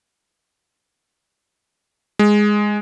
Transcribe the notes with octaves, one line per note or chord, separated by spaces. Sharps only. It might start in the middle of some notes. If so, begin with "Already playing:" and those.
G#3